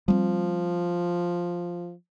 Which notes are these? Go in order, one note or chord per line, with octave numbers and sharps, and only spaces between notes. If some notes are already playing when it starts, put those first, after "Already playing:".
F3 G3 A3 C4